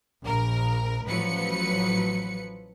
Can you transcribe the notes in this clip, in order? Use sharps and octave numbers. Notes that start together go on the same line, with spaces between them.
A#1 A#4
A1 F3 F#3 B4 C#7